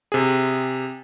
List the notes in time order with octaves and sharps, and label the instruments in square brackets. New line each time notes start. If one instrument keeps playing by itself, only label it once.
[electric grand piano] C3 G#4